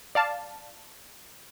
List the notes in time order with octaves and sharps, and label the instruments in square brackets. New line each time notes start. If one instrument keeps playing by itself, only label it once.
[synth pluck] D5 F5 A5